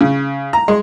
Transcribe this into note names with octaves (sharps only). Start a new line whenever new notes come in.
C#3
A#5
G#3